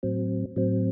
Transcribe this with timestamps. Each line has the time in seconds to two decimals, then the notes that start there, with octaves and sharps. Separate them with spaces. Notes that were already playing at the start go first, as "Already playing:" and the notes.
0.03 A2 F#3 C4
0.56 A2 F#3 C4